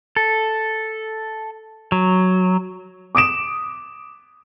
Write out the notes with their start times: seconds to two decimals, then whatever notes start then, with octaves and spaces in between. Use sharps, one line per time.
0.16 A4
1.92 F#3
3.15 D6 D#6 D7 E7